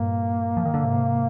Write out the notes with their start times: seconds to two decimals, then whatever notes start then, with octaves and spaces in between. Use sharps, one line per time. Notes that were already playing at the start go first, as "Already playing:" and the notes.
Already playing: G2 A#2 A#3
0.57 F3
0.65 D#3
0.74 D3
0.83 G#2 C3